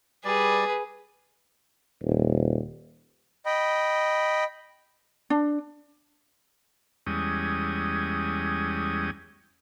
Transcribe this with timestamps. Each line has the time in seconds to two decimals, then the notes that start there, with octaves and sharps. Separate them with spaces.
0.25 G3 G#4 B4 D5
2.03 D#1
3.46 D#5 G5 B5
5.30 D4
7.07 E2 G3 G#3 C#4 D#6